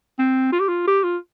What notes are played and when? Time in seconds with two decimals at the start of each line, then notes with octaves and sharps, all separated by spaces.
0.19 C4
0.52 F4
0.60 G4
0.68 F4
0.87 G4
1.04 F4